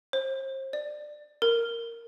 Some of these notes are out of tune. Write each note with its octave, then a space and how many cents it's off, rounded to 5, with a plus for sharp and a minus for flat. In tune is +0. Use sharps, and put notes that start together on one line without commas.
C5 +35
D5 +20
A#4 -5